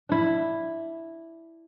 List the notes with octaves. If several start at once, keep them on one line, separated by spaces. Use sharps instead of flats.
D4 E4